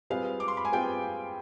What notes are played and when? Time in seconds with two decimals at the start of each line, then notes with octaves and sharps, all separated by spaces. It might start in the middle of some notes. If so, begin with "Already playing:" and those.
0.10 G3 C4 F4 G#4 B4 F5
0.40 D6
0.48 C6
0.57 B5
0.65 G#5
0.72 G3 C4 F4 G#4 B4 G5